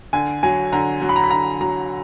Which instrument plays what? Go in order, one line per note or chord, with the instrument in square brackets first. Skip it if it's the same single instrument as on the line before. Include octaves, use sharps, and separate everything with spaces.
[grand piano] D3 G#5
F#3 G#5
D3 A#5
F#3
B5
A#5
B5
D3 A#5
F#3 A#5